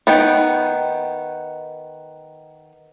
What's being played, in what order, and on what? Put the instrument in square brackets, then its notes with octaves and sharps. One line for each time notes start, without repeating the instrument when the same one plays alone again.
[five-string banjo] D#3 B3 G5